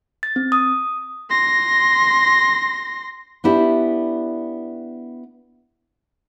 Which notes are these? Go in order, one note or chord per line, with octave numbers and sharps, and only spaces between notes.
A6
C4
D#6
C6 A#6
B3 D4 E4 G4